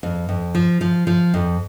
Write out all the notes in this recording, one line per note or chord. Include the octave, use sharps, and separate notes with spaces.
F2
F2
F3
F3
F3
F2